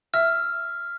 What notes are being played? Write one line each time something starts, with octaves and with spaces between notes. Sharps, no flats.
E5 F6